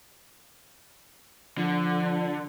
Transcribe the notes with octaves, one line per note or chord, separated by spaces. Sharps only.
D3 F3